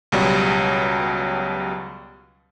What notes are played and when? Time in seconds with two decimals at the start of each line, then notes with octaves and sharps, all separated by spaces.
0.12 C#2 B2 F#3 G3